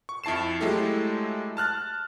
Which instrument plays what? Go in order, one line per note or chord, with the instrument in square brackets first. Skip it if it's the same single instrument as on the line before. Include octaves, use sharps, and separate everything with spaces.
[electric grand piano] C#6
F2 E4 A5 C7 E7
F#3 G#3 A3 E4 G4 A4
A5 F6 F#6 A6